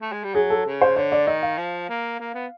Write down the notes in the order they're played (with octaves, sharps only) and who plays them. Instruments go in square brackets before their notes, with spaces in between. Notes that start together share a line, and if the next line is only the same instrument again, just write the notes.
[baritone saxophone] A3
G#3
G3
[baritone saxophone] F#3 [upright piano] G#4
[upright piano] A4
[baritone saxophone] C#3
[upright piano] C5
[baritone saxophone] D3 [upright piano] C#5
[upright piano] D5
[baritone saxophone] D#3 [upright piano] D#5
[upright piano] F5
[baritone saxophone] F3
A#3
A#3
B3